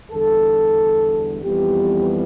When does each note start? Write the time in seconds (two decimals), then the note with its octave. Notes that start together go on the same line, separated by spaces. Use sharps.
0.11 E2 D3 G3 A4
1.43 F2 E3 G3 B3 G4